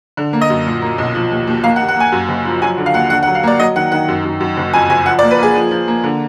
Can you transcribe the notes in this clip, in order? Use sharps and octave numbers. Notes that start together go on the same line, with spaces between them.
D3
A#3
D#5
F#2
A#2
A#3
B1
F3
D#2
D#2
A#3 F5
F#5
D#2
F#5
A#3 G#5
F#2
F#1
F3
F#3 G#5
D3
F5
D#2 F#5
D3 F#5
F#5
F#3
F5
A#3 D5
F#3 D#5
D#3 F#5
D#3 F#5
F#2
F#2
F#2
F#1
F2 G#5
F#1 G#5
F3 F#5
D5
A#3
B4
A#3 G#4
F3
F3
A#3
D3